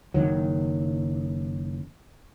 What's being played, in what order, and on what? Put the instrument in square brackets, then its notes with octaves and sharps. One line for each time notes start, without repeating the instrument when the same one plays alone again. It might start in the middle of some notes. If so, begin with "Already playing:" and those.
[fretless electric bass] F#1 C#2 D#3 F#3